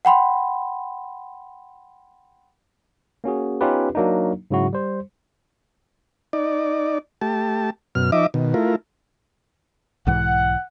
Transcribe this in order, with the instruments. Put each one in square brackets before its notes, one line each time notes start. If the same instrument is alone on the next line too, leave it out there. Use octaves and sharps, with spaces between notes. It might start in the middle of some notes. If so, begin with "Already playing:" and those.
[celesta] F#5 G5 B5 C6
[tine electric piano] A#3 C#4 F#4 G#4
B3 C#4 D#4 F4 G4 B4
F#3 A#3 D4 D#4
G#2 C#3 F#3 E4 F#4
G3 C5
[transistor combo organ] D#4 D5
A3 G4 A5
F#2 B2 F6
F3 D#4 D#5 E5 D6
B2 D#3
A3 E4 F4 A#4
[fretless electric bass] B1 G#2 E3 [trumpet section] F#5